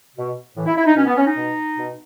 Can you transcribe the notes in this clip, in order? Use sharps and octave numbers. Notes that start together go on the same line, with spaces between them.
B2
A2 E3
E4
E4
D#4
B2 C#4
B3
C#4
D#4
B2
B2